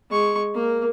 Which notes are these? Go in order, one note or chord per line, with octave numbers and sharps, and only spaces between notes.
G#3 C#6
A#3 A#4